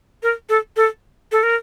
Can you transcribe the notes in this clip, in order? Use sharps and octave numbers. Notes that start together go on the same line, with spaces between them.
A#4
A4
A4
A4
A#4